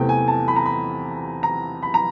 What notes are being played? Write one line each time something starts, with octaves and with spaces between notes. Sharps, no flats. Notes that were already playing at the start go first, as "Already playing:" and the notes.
Already playing: E2 C3 E3 A3 G5
G#5
A5
B5
A#5
B5
A#5
B5
A#5